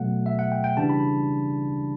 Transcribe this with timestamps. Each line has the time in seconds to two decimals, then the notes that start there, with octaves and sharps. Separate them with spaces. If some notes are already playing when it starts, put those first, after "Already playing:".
Already playing: B2 F#3 A3 F#5
0.26 E5
0.39 F#5
0.52 G5
0.64 G5
0.77 C#3 E3 G3 D4 A5
0.89 B5